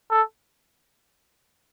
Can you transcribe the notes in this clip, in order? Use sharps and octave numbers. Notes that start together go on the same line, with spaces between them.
A4